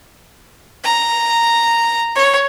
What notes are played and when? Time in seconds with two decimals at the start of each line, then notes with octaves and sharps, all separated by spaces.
0.84 A#5
2.15 C#5